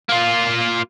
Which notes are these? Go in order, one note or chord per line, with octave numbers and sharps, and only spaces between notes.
A#3 F4